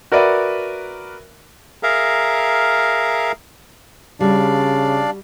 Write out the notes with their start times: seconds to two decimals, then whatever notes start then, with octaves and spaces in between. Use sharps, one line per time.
0.12 F#4 A#4 B4 D5 E5
1.83 G#4 A#4 E5 F5 A#5
4.20 C#3 G3 D4 F#4 D5 F5